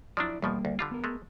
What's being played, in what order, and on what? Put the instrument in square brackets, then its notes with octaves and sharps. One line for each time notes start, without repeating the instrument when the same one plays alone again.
[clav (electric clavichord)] F3 F#3 D4 [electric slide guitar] E4 D5
[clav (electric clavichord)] E2 B2 F3 [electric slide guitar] G3 A#3
[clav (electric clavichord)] D2
D3 G3 F4
[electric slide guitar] B3 A#4
[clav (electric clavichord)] G#3 A3